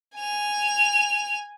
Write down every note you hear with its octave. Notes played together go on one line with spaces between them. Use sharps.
G#5 F7